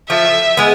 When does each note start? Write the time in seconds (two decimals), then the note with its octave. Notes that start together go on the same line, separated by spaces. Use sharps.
0.09 F3 A3 E5
0.57 G#3 B3